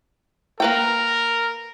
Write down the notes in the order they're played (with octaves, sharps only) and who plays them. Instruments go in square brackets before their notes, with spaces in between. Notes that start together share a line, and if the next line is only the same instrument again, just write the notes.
[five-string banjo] A#3 B4 G5 [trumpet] A#4